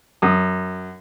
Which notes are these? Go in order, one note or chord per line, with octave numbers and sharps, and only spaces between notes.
F#2 D#6